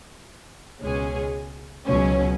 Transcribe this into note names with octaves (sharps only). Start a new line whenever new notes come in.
C#2 B2 G#3 C#4 G#4
C#2 B2 F#3 C#4